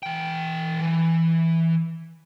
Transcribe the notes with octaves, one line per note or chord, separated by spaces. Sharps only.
E3 G5
E3